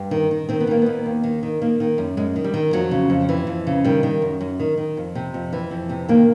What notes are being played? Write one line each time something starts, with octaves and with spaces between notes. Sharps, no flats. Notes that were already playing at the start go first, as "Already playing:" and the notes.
Already playing: G2
D#3
D#3
D#3 C4
B3
D#3 A#3
D#2 B3
D#2
D#3
D#3
D#3 A#3
D#3
F#2
F#2 G#3
D#3
G3
D#3
F2 F#3
C#3
F2
E3
F2
C#3
D#3 G3
D#3
F#2
F#2
D#3
D#3
F2
C3
F2
E3
F2
C3
D#3 A#3